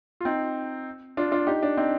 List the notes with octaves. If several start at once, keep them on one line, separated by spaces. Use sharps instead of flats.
F4
C4 D#4
D4 F4
D4 F4
D#4 G4
D4
C4 D#4